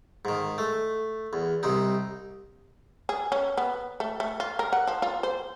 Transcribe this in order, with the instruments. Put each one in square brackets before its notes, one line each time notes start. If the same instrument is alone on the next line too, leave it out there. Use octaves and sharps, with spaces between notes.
[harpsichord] G#2 D#3
A3
E2
C2 C3 D#4
[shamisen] G#4
C#4
B3
A3
A3
F4
A#4
F#5
F3
F4
C5